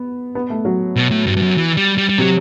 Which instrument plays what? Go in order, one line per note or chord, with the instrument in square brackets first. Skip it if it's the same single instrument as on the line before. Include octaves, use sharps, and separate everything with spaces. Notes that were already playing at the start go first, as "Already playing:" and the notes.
Already playing: [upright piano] B3
B3
A3
F#3
[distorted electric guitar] B2
A2
G2
G2
F#2
E3
G3
G3
G3
[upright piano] C3 [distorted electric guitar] F#3